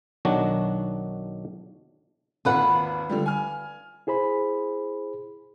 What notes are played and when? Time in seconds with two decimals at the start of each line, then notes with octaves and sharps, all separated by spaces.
0.25 B1 D#3 F#3 D4 F#4
2.45 G#1 D#2 F4 B4 F#5
3.09 D3 F3 G3
3.26 G#5 F6
4.07 E4 G#4 C5 B5